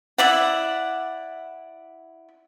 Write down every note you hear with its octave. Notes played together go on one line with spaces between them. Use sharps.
E4 D5 F#5